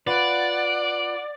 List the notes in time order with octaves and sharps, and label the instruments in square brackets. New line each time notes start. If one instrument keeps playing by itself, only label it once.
[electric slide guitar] F4 B4 [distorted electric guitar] D5 [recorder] F#5